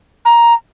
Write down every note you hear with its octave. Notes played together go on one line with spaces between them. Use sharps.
A#5